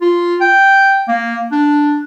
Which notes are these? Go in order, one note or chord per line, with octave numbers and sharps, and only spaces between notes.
F4
G5
A#3
D4